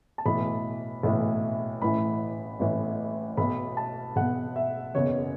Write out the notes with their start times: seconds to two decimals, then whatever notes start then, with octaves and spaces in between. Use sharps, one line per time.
0.18 A5
0.26 B1 A2 E3 B5
1.03 B1 A2 E3
1.82 A1 A2 E3 B5
2.59 A1 A2 E3
3.37 B1 B2 B5
3.77 A5
4.16 B1 B2 F#5
4.56 E5
4.95 F#1 E2 B2 C#5